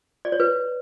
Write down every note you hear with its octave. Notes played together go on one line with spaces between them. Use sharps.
D5
C#5
B4